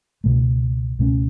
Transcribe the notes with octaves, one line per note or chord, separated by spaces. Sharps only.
C#2 B2 A3
C#2 B2 A3 C#4